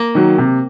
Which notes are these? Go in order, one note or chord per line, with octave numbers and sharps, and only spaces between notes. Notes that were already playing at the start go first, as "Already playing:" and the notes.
Already playing: A#3
D#3 F#3
C3